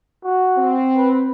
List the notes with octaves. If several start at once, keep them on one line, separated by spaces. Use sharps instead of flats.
F#4
C4
B4